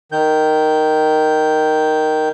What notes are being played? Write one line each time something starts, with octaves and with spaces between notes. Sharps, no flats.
D#3 G6